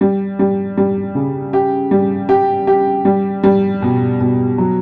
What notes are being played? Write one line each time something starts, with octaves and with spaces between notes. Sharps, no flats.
G3
G3
G3
C#3
G4
G3
G4
G4
G3
G3
B2
B2
F#3